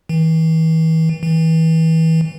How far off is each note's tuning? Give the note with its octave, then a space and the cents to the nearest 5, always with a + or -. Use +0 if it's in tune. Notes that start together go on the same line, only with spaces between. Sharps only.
E3 -40
E3 -30